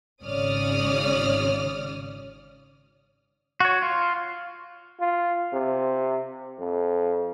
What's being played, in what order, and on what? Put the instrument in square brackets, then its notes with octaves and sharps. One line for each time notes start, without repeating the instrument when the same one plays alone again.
[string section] G#1 C#3 C#5 D5 D#6 F6
[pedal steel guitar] F#4 C#5
F4
[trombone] F4
C3
F2